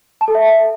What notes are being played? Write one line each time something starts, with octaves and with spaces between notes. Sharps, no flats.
A5
A4
E5